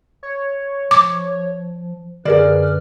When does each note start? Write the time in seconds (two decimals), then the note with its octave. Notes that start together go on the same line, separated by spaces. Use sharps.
0.23 C#5
0.91 F3 D6
2.25 F#2 D3 G#4 A#4 B4 D5 F6